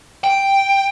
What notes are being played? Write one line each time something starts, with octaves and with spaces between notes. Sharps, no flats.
G5